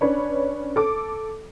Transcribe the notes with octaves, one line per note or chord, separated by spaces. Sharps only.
C#4 D4 B4 C#5
A4 D6